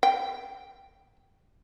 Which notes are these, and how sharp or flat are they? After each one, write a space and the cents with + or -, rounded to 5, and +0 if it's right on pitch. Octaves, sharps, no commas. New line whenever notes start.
G5 +0